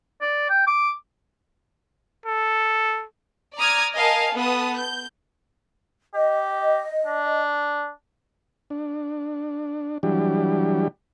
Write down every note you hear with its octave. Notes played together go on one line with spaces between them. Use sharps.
D5
G5
D6
A4
D5 A#5 D#6 F6 G#6
A#4 D#5 F5 G#5 A5
B3 A4 D#6
G6
G4 D#5
D4
D4
E3 F#3 G3 D4 G4